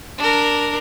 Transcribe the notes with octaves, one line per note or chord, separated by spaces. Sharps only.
D4 A#4